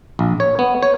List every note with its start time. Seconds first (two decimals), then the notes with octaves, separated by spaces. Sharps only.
0.19 A#1
0.40 C#5
0.59 B3
0.83 C#5